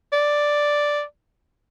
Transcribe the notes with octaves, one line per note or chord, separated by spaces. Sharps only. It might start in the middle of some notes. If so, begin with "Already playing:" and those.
D5